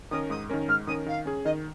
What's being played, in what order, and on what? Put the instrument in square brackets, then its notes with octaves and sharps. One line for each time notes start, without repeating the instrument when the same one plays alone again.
[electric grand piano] D#3 C#4 A#4 [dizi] D#6
[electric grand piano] G#2 [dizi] D#6
[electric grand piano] D#3 C#4 A#4
[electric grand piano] G#2 [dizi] F6
[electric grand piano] D#3 C#4 A#4 [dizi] D#6
[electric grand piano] D#3 [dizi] F5
[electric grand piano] C#4 G#4
[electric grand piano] D#3 [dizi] D#5